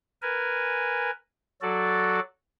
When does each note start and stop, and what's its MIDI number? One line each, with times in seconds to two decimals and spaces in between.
0.22 1.11 70
0.22 1.11 71
0.22 1.11 80
1.62 2.20 54
1.62 2.20 66
1.62 2.20 69
1.62 2.20 74